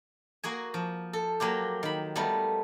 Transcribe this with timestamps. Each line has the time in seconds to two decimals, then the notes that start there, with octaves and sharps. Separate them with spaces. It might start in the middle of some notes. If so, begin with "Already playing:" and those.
0.44 A#3 F#4 G#4 G#5
0.74 F3
1.13 A4
1.40 F#3 A#3 F4 G4
1.83 D#3 B5
2.16 G3 A3 B3 A#4